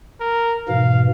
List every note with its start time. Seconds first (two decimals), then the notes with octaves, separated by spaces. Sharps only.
0.20 A#4
0.68 G#2 B2 E3 F5